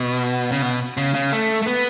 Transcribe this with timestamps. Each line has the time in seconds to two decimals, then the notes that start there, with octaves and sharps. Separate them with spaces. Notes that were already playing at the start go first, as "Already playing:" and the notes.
Already playing: B2
0.52 C#3
0.62 B2
0.97 C#3
1.14 C#3
1.33 A3
1.62 A3
1.67 B3